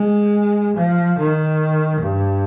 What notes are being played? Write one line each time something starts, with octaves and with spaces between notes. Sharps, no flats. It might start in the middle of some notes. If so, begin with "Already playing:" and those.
Already playing: G#3
F3
D#3
G2